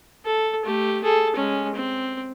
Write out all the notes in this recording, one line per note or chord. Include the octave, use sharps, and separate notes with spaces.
A4
A3 G4
G#4 A4
G#3 C#4
C4